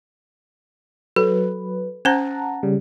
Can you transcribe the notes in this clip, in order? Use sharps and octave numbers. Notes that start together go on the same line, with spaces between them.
F#3 A4 B4
C#4 C5 F#5 A5 A#5
C#3 G3